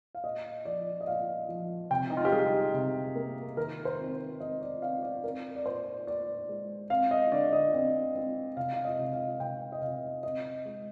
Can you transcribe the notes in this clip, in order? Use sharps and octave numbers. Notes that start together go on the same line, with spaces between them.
F5
A#2 D#5
F3 D5
D#5
A#2 F5
F3
C3 G5
D#4
F4
G4
G3 G#4
C3
A#3
D#3 A#4
C5
C4
C4 D#5
D5
C4 F5
D5
C4 A#4
D5
A#2 C5
A#2 D5
G#3
C4 F5
D#5
D3 D5
D#5
C4
C4
C3 F5
F5
D#5
C3
F5
C3 G5
D#5
C3 F5
C4 D#5
G#3